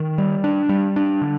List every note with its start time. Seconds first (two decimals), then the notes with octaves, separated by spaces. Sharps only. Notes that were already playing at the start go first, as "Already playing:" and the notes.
Already playing: D#3
0.18 G3
0.44 D4
0.69 G3
0.96 D4
1.21 D3